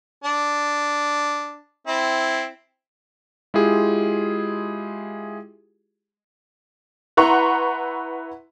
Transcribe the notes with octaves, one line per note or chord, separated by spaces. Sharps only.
D4
C4 E4
G#3 E4 F4 G4 G#4
E4 B4 F#5 A#5 C6 C#6